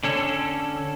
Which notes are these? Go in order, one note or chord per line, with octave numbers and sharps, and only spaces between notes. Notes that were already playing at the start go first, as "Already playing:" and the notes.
D3 C#4 A4